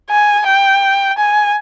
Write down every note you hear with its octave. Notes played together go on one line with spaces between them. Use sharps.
G#5
G5
G#5